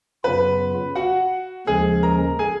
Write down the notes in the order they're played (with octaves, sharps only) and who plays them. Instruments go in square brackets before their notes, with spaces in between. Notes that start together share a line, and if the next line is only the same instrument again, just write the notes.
[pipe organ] F#2 C#3 F#3 B3 F4 [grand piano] B4 B5
[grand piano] F#4 F#5
[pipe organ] D#2 C#3 F3 G#3 C#4 [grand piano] G#4 G#5
[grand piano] A#4 A#5
G#4 G#5